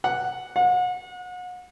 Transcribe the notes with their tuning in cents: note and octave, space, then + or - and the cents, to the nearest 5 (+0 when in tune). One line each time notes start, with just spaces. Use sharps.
F#5 +0
F#5 -35